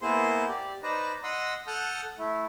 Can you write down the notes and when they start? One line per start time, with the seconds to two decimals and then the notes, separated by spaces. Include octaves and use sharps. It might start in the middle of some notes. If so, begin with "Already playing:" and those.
0.02 A#3 B3 E4 G#4 C5 C6
0.49 G4 D5
0.83 D#4 B4 C5 D5 D#5 A#5
1.24 D#5 F#5 C6 D#6 E6
1.67 A4 F#5 A5 D#6 F6 G6
2.18 A3 E4